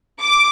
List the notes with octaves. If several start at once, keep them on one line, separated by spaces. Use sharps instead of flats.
D6